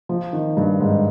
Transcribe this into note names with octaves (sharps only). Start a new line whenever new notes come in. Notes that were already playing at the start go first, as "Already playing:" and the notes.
F3
D#3
G2
G#2